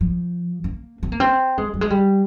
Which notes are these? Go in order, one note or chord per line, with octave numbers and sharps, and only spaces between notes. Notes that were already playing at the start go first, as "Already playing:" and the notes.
F3
A#3
C4
A#3
C4
G#3
G3
G#3
G3